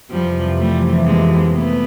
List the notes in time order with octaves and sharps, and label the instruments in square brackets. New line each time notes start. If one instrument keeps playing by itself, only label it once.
[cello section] F2 C3 E3 [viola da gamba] F3 G3
[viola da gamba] G3 A3
G#3 A#3
A3 B3